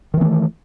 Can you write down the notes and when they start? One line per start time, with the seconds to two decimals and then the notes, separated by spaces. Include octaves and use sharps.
0.14 D#3
0.17 E3
0.21 B3
0.25 A3